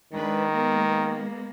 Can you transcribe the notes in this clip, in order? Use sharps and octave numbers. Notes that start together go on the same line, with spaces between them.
D#3 G#3 D4 B4
G#3 A#3 B3